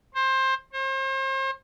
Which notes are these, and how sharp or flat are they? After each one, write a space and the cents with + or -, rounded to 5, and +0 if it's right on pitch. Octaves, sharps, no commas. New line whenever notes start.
C5 +20
C5 +40